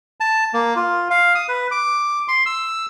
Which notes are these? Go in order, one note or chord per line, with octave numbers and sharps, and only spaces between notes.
A5
A#3
F4
F5
D#6
B4
D6
C6
E6